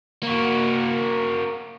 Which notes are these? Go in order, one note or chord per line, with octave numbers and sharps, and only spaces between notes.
A#3 F#4